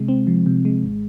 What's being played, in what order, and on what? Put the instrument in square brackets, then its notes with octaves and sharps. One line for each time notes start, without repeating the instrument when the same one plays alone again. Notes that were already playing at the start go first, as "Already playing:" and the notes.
Already playing: [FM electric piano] C3 G#3
C4
F3
C3
G#3
G#1